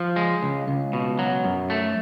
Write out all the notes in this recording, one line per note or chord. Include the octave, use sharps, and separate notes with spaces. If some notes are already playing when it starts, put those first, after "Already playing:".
Already playing: F3
G#3
C#2
C#2
B2
F#3
F#2
A3